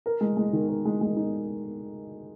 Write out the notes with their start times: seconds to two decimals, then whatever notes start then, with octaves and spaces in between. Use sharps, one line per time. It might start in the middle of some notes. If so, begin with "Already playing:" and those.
0.06 A#4
0.21 G#3
0.37 G#3
0.53 D#3
0.69 A#4
0.85 G#3
1.01 G#3
1.17 D#4